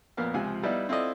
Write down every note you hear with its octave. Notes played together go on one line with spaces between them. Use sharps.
F2 A#2 B3 A#4 F5
C#2 C3 F3 G#5
G3 B3 D#4 E4 D5 F5
C4 E4 F4 A4 D5 D#5